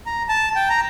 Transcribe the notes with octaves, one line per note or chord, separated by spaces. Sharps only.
A#5
A5
G5
A#5